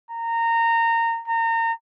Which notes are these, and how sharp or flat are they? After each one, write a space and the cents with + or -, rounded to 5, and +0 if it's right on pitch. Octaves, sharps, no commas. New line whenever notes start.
A#5 -20
A#5 -30